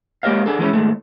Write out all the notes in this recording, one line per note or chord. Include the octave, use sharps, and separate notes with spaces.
G#3 A#3 G4 C#5 D#5 F5
D4 G#4 A4
E3 G#3 C#4 E4
D#2 G#2 G#3 A3